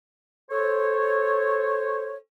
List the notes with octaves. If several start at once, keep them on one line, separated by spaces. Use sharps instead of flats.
A4 C5 C#5